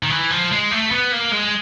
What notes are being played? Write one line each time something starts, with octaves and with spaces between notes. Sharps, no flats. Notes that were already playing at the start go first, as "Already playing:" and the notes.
D#3
E3
F3
G#3
A3
B3
A#3
G#3